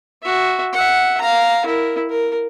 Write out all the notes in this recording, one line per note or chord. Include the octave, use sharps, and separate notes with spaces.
F#4 E5
E5 F#5
F5 A#5
E4 A#4
A#4